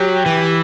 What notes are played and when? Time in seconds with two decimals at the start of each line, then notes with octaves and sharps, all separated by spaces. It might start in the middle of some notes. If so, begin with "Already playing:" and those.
Already playing: F#3 G4
0.26 E3